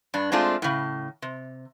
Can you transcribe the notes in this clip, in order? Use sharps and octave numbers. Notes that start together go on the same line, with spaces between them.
G2 D4
G#3 A3 C4 D4 F4
A2 C#3
C3